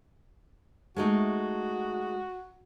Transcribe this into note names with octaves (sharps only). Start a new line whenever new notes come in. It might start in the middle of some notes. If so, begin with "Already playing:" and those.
G#3 A3 D#4 F#4